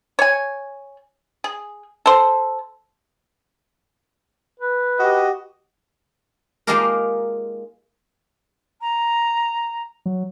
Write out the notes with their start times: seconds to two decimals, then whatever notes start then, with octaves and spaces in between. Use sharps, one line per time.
0.19 C#5 G#5
1.44 G#4
2.06 A4 C5
4.60 B4
4.99 F#4 G4 D#5
6.67 G#3 A#3 D#4 F4 G4 A#4
8.81 A#5
10.06 F#3